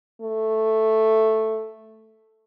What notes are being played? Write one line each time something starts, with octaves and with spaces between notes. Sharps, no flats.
A3